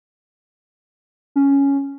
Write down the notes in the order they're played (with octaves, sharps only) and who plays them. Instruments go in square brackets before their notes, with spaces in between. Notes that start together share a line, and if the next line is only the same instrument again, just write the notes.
[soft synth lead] C#4